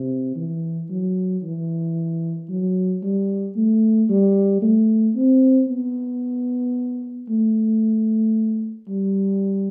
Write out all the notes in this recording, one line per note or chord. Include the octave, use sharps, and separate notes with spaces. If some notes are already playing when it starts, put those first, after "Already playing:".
Already playing: C3
E3
F#3
E3
F#3
G3
A3
G3
A3
C4
B3
A3
G3